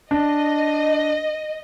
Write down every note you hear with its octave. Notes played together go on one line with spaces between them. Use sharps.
D4 D#5